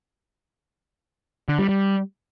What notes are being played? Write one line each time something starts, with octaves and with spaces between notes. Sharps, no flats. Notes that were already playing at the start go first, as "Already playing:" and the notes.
D3
G3
G3